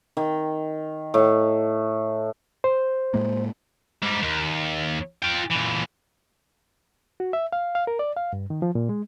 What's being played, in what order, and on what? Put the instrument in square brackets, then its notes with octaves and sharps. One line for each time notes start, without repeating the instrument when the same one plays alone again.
[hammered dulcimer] D#3
A2
[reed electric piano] C5
[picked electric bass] A2 G#3 A#3
[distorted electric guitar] G#2 G3
D#2
F4 G5
A#2 E3
[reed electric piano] F#4
E5
F5
F5
A#4
D5
F5
G2
D#3
F3
A#2
G#3